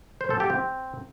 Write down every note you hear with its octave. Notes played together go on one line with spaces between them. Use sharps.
C5
A4
G4
C4